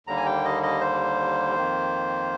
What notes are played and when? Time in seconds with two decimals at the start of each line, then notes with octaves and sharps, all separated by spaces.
0.07 D#2 D3 G3 A#3 A#5
0.17 G#5
0.26 G5
0.45 D#5
0.63 D#5
0.81 C5
1.55 F2 D#3 A#3